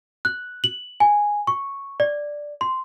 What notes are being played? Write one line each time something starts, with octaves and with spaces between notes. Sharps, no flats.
F#6
F#7
G#5
C#6
D5
C6